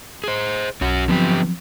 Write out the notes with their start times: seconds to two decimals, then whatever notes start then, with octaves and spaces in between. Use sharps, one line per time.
0.24 G#4 C5
0.81 B1 C#4 F#4
1.08 D3 F3 F#3 B3 C4 G4